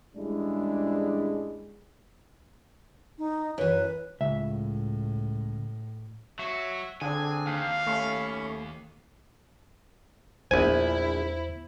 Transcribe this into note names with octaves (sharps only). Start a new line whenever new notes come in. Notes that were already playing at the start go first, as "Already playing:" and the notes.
A1 G3 G#3 D4 E4 G#4
D#4
F#2 E3 B4
C#2 A2 E5
F#3 F#4 E5
D3 C4 D4 G#4 G#5
D#2 F5
A3 C#4 B5 C#6
A#1 E2 B3 E4 C5 G#5